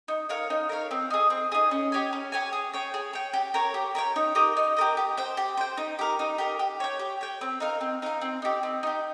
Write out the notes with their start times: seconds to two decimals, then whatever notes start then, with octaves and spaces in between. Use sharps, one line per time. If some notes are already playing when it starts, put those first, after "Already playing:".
0.08 D#4
0.29 A#4 C#5 F5
0.50 D#4
0.69 A#4 C#5 F5
0.91 C4
1.10 D#4 G#4
1.30 C4
1.52 D#4 G#4
1.71 C#4
1.92 G4 C#5 G#5
2.13 C#4
2.32 G4 C#5 G#5
2.53 G#4
2.74 C#5 G5
2.94 G#4
3.13 C#5 G5
3.33 G4
3.54 A#4 C#5 G5
3.74 G4
3.95 A#4 C#5 G5
4.16 D#4
4.35 G4 A#4 D#5
4.57 D#4
4.77 G4 A#4 D#5
4.97 G4
5.17 C5 G5
5.37 G4
5.57 C5 G5
5.77 D#4
5.99 G4 A#4
6.19 D#4
6.38 G4 A#4
6.59 G4
6.80 C#5 G5
6.99 G4
7.21 C#5 G5
7.41 C4
7.60 D#4 A#4 F5
7.81 C4
8.02 D#4 A#4 F5
8.21 C4
8.42 D#4 G4
8.63 C4
8.83 D#4 G4